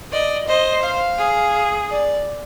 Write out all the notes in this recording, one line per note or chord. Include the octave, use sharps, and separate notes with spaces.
D5 D#5
C5 D#5
F5
G#4
D5